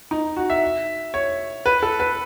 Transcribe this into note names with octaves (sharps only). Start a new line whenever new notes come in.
D#4
F#4
E5
C#5
B4
A4
B4